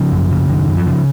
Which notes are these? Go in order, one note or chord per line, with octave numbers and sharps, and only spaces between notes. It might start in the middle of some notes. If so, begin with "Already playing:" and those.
Already playing: C#3 F3
F#2
C#3
F#2 D#3
F#2
F3
C#3